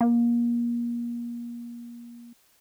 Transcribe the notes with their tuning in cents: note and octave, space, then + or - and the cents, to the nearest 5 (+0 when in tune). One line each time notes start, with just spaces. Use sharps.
A#3 +30